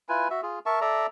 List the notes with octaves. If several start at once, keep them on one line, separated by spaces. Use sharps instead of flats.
E4 F4 B4 G#5
F#4 E5
F4 G#4
A#4 E5 A5 C#6
A4 D5 E5 A#5